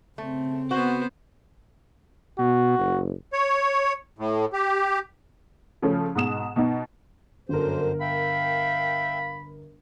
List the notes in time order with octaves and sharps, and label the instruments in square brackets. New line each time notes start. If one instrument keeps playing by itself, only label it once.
[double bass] C#3 C4 [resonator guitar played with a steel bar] A3
[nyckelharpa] B3 C5 [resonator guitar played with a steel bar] F#4
[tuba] B2 [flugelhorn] F#4
[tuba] F#1
[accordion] C#5
A2
G4
[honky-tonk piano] C#3 F3 A3 C#4
G#2 B2 D#6 E7
B2 B3 D#4
[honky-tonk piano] G1 A#4 [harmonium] F#2 D3 C5
[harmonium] E5 G5 [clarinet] F5 [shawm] B5